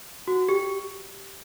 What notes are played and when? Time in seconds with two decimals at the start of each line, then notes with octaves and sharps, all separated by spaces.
0.28 F#4
0.49 G4